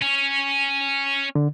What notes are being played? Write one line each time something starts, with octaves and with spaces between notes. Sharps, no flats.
C#4
D3